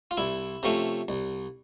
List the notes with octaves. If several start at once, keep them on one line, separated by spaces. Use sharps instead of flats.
F4
C2 E4
C3 F3 A3 C#4
C2